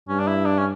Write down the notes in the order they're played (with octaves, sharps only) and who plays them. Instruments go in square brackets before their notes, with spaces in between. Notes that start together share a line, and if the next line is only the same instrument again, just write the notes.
[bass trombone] G2 [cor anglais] C#4
[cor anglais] D4
E4
D4
C#4